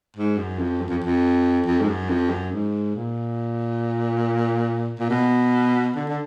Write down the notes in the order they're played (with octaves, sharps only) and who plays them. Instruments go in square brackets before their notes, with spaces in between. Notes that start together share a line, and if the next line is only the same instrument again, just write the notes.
[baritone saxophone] G#2
F#2
F2
F#2
F2
F2
F2
G#2
F#2
F2
F#2
G#2
A#2
A#2
B2
D3
D3